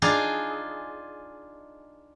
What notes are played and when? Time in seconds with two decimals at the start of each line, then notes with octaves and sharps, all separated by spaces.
0.02 D4 D#4 F4 G#4